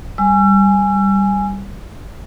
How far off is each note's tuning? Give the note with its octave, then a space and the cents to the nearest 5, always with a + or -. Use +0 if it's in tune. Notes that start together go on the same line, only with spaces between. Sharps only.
G3 +0 G#5 +0 E6 +40